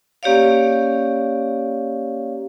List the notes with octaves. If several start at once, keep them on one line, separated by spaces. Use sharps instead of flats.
A#3 C#4 G4 C#5 D5 F5